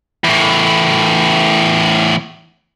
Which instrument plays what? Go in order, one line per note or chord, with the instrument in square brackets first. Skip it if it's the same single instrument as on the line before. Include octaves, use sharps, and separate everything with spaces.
[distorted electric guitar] E2 A2